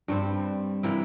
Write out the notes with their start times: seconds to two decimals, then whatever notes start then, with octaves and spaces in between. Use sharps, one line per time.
0.08 G2 G3 C4
0.83 C3 E3 A#3 E4